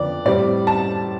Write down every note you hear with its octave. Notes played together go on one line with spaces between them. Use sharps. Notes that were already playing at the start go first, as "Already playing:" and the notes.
Already playing: F2 D3 F3 B3 D5
A2 G3 C4 D5
A5